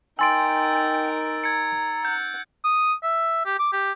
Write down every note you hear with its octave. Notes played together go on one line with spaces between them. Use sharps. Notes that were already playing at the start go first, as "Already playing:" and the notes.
D#4 A#4 G5 G#5 C6 E6 A6 D7
A#5 G#6 C#7
F#5 G6
D#6
E5
G4
D6
G4